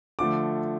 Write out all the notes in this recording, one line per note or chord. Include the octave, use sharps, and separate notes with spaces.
D3 F3 A3 D6